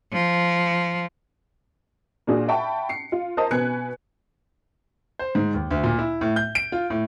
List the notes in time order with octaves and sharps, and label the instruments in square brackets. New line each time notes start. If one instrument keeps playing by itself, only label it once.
[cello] F3
[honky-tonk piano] A#2 D4 F#4 G#4
E5 F#5 G5 A5 B5 C#6
C7 C#7
F4
A#4 C5 D#5 A5 A#5 D#6
B2 B4 G#5 F#6 G#6 C#7
[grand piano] C5
G#2
D#2
D2
A#2
E4
A2
G6
D7
F4
A2